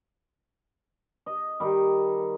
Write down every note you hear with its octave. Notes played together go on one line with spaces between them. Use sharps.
D#5
D#3 G3